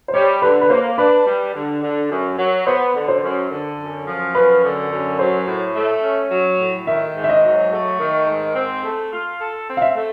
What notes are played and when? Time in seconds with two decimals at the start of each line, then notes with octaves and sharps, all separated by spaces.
0.08 C5
0.14 G3 C#5
0.42 D3 B4
0.61 B4
0.70 A#3 C5
0.98 D4 B4
1.26 G3
1.54 D3
1.83 D3
2.11 F#2
2.38 F#3
2.67 B3 C5
2.94 D3
3.08 C5
3.23 F#2
3.50 D3
3.79 F#2
4.06 F3
4.35 F#2 B4
4.63 D3
4.91 F#2
5.19 F#3 C5
5.46 A2
5.75 A3
6.03 C#4
6.31 F#3
6.59 A2
6.87 D#3 E5
7.15 G#2
7.24 E5
7.29 D#5
7.43 F#3
7.71 A3
8.00 D#3
8.28 G#2
8.56 C4
8.83 A3
9.12 F4
9.40 A4
9.68 C4
9.77 F5
9.82 E5
9.96 A3